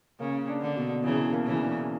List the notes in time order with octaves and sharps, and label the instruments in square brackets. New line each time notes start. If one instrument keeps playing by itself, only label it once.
[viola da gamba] C#3 [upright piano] A#3
[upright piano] D4
[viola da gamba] D3
[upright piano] B2
[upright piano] E2 [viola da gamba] C#3 E3
[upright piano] A#3
[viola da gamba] C#3 E3
[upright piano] D4